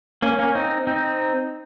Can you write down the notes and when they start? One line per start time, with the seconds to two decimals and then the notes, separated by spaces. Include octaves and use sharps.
0.22 A#3 C#4
0.39 A#3 C#4
0.55 C4 D#4
0.87 C4 D#4